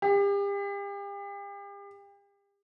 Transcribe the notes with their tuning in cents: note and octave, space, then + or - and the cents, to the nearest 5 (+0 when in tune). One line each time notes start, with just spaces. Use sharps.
G4 +40